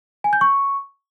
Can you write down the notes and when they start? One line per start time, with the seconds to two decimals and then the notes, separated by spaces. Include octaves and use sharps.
0.24 G#5
0.33 G6
0.41 C#6